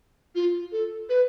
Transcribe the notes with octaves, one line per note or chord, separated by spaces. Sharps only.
F4
A4
B4